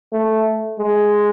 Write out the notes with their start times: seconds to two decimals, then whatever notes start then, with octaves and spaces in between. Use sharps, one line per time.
0.12 A3
0.79 G#3